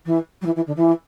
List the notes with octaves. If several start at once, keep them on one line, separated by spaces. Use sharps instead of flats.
E3
F#3
E3
E3
D3
E3